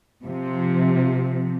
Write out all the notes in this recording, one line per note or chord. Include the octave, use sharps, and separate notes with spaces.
C3 F3